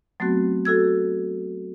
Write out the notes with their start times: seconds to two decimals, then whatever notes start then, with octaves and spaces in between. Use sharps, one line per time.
0.20 F#3 A3 B3 C4 F#4
0.65 F#4 A4 E6 G#6